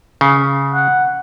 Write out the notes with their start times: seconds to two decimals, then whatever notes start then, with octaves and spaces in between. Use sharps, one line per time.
0.21 C#3
0.74 F#5